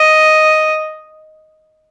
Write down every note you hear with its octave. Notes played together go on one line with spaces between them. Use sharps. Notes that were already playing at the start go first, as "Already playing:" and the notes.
Already playing: D#5